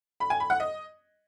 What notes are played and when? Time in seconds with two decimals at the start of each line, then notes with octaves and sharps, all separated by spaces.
0.20 B5
0.30 G#5
0.40 B5
0.50 F#5
0.60 D#5